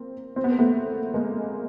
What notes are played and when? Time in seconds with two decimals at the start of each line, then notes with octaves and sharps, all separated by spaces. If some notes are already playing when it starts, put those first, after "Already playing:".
Already playing: A#3 C4
0.36 C4
0.44 B3
0.52 A#3
0.59 A3 B3
1.14 G#3 A#3